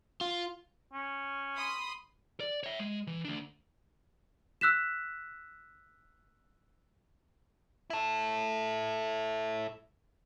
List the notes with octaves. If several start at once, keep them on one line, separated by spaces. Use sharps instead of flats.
F4
C#4
B5 C6 D#6
D5
C#5 E5
G#3
E3
D2 D4
E6 F#6 B6 E7
E4 A4